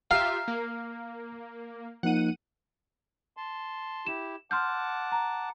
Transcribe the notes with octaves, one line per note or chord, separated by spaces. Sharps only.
F4 G4 E5 F5 A#5
A#3
F3 A#3 D#4 F#5 D#7
A5 C6
E4 G4 E7
F#5 A5 C6 D6 F6 G6
A#5